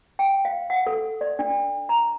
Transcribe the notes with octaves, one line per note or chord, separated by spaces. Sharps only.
G5
F5
F#5
A4
D5
D4
A#5